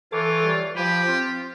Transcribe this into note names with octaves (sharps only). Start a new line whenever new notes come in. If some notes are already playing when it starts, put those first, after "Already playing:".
E3 F4 A4 C#5 D6
G3
F3 G4 G#5 B5
C4 F4